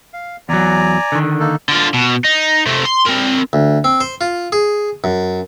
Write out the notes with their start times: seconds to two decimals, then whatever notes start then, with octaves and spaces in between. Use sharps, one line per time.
0.13 F5
0.49 E2 F#3 D5 G#5 A#5
1.12 D3 D#3
1.40 A#3 D#4 A4
1.68 D3 F4
1.94 B2
2.25 D#4
2.67 C3 A3
2.85 C6
3.06 C4 A#4
3.53 D2
3.84 C4
4.01 C5
4.21 F4
4.52 G#4
5.04 F#2